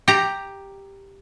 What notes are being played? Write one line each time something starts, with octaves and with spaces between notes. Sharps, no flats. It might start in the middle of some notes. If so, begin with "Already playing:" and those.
G4 A#5